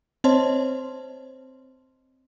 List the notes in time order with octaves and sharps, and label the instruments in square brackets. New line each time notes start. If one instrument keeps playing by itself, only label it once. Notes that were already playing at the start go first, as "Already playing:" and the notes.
[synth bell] C4 C5 C#5 D#5 A5 C6